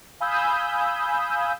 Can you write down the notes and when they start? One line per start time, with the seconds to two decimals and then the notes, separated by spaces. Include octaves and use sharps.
0.20 F5 G#5 B5 D#6 E6 G6